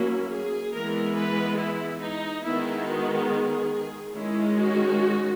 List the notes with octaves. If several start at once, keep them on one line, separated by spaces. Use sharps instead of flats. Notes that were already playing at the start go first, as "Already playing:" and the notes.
Already playing: F#3 A#3 C#4 E4
G#4
E3 G#3 B3 A#4
B4
E4
D#4
D#3 G#3 B3 E4
F#4
G#4
D#3 G#3 C#4 E4
F#4